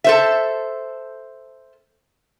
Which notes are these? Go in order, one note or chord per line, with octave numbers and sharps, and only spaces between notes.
A4 C5 E5